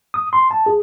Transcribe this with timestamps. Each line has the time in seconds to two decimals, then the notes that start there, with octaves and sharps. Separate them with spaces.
0.14 D#6
0.33 C6
0.51 A5
0.66 G#4